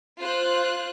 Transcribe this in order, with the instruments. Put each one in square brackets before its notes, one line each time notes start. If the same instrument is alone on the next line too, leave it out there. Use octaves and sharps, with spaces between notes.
[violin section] F4 C5 F#6